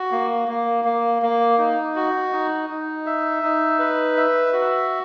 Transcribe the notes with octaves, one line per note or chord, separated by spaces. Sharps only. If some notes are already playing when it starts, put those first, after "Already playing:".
Already playing: F#4
A#3
A#3
A#3
A#3
D#4
F#4
D#4
D#4
E5
D#4
B4
E5
F#4